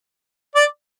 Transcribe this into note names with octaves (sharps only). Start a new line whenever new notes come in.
D5